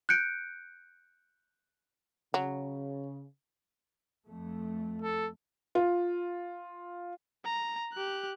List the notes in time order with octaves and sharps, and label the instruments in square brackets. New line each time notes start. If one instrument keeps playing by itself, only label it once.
[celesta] F#6 G6 C#7 D7
[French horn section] C#3 [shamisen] F#3
[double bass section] F2 A3
[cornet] A4
[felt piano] F4
[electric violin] A#5
G4 F#6